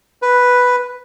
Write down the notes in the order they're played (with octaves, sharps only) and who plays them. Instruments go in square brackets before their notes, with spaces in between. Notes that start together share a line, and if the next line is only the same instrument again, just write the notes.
[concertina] B4